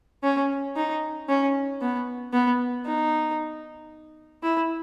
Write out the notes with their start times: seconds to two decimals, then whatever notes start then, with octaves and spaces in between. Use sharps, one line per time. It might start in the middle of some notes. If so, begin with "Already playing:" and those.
0.23 C#4
0.76 D#4
1.29 C#4
1.81 B3
2.33 B3
2.86 D#4
4.43 E4